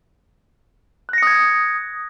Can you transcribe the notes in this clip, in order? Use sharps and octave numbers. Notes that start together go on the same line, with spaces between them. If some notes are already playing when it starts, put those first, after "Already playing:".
D#6 F#6 G#6 A#6 C#7